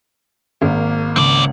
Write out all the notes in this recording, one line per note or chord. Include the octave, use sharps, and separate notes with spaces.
G#1 A#3
C#2 C#3 C4 D5 C#7